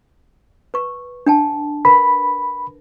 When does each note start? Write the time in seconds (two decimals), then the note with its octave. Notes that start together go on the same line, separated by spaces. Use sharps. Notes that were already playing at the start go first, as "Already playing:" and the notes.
0.74 B4 C#6
1.26 D4 G5 A5
1.85 A#4 B4 B5